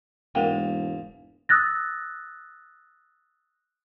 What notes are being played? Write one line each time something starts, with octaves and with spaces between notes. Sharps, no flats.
E1 G#2 A#3 A#4 F#5 G5
D#6 E6 F#6 A6 A#6